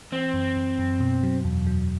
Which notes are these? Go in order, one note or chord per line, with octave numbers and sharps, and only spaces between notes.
E3 C4
F#2
F#2
F#2
B2
F#3
E2
F#3